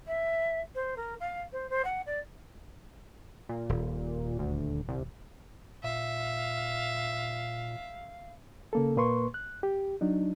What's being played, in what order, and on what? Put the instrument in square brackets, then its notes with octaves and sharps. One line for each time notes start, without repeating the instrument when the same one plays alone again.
[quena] E5
C5
A#4
F5
C5
C5
F#5
D5
[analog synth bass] A#2
[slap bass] D#1
[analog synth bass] D2
C2
[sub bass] A#2 [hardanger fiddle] E5 [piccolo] F5
[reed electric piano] C#3 A#3 A4
A#2 A#3 B4 C6 C#6
F#6
G4
F#3 D4 D#4